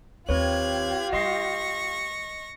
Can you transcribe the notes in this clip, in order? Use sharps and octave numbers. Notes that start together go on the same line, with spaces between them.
D#2 C4 F4 G4 B4 C#5 F#6 G#6
G3 D#5 C6 C#6 A#6 C7